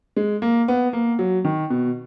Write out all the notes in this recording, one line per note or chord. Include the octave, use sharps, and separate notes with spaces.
G#3
A#3
B3
A#3
F#3
D#3
B2